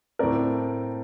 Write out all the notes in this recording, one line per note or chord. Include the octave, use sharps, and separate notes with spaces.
A2 A3 C4 A#4 D5